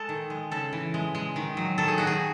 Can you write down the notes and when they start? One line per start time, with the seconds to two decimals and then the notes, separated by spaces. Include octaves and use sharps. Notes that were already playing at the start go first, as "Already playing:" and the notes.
Already playing: G#3 A4
0.09 D#3
0.30 G#3
0.51 C#3 A4
0.73 E3
0.94 G#3
1.15 G#3
1.36 D#3
1.57 F#3
1.78 D#3 A4
1.88 G#4
1.98 D#3 F#4
2.07 G#4